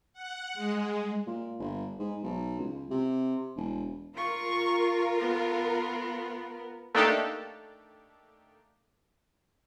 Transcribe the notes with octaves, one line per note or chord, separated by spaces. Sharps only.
F#5
G#3
A#2
G1
G#2
B1
C#2
C3
E1
F4 A#4 C#6
B3
A3 A#3 D4 D#4 G4 A4